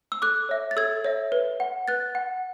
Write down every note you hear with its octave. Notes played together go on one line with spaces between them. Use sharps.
E6
A4 D6 F#6
C#5 E5
A6
A4 E6 G#6
C#5 E5
B4
F#5
B4 F#6 A6
F#5